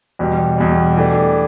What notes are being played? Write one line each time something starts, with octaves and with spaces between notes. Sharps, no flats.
E2 B2 G3
E2 B2 G3
E3 A3 D4 G4